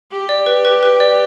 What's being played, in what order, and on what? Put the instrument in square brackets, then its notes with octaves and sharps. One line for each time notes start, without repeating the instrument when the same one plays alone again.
[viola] G4
[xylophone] D5
B4
B4
B4
D5